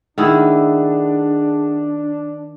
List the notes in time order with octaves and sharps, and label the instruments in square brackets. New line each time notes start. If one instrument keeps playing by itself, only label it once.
[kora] D#3 A3 E4 [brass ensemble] D4 [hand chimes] G#4 F#5 D#6